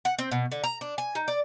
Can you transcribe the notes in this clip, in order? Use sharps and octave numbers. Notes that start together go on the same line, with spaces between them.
F#5
C4
B2
D3
A#5
D4
G#5
D#4
D5